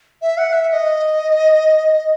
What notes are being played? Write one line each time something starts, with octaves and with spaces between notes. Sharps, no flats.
E5
F#5
E5
E5
D#5